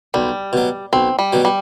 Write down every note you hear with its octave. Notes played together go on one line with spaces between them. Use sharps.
B1 G3
B2 F#3
B1 C4
G3
B2 F#3
G3